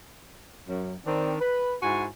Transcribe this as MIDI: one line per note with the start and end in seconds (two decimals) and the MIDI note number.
0.68 0.94 42
1.05 1.34 51
1.05 1.34 60
1.05 1.34 62
1.40 1.74 71
1.82 2.05 44
1.82 2.05 64
1.82 2.05 66
1.82 2.05 80